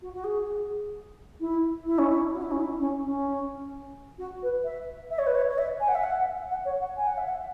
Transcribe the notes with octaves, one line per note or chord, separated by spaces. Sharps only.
F#4
F#4
G#4
E4
E4
C#4
E4
F#4
E4
C#4
E4
C#4
C#4
F#4
B4
E5
E5
C#5
B4
C#5
C#5
E5
G#5
F#5
E5
F#5
F#5
C#5
F#5
G#5
F#5
E5
F#5